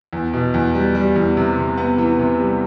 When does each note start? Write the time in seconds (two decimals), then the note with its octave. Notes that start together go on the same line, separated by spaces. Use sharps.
0.13 E2
0.34 B2
0.54 E2
0.75 G3
0.95 G3
1.16 E2
1.37 C3
1.57 C3
1.77 B3
1.98 E3
2.19 C3
2.40 G3